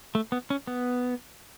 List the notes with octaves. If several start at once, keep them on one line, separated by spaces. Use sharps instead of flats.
A3
B3
C#4
B3